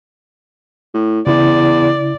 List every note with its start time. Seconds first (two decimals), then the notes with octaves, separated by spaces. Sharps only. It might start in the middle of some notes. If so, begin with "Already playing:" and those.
0.94 A2
1.27 E2 C#3 E4 D5